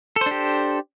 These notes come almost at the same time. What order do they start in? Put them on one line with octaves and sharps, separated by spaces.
A4 C5 D4 G4